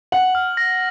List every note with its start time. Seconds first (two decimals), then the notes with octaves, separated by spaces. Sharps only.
0.12 F#5 F#7
0.35 F6
0.57 A#6